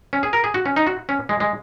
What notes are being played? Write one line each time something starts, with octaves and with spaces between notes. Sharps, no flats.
C#4
G#4
A#4
G#4
F#4
C#4
D#4
F#4
C#4
G#3
G#3